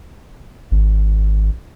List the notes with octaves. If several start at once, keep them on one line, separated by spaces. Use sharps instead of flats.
G#1